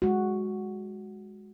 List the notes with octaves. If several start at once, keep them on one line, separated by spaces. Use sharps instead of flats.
G#3 F#4